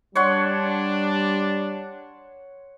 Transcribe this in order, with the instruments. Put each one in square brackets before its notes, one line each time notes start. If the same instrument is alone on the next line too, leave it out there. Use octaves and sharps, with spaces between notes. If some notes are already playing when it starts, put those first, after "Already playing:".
[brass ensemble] G3 D4 [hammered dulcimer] C#5 F#5 C6